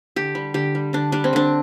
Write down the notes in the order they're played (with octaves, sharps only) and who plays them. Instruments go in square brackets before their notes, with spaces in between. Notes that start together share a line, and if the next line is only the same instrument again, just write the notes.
[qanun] D3 G4
G3
D3 G4
G3
D3 D4
G3 D4
C4
D3 D4